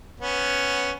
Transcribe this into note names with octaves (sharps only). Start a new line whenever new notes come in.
B3 C#4